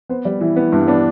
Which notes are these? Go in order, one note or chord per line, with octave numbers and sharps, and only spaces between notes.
B3 C5
G3 D5
E3 E4
B3
G2 E4
B3 D4